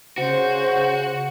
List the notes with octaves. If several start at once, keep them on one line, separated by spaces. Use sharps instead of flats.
C#3 F#4 C5